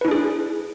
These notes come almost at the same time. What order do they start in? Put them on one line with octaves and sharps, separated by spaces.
B4 E4 D4 G#4